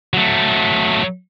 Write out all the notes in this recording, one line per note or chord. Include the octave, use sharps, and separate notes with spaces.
F#3 A3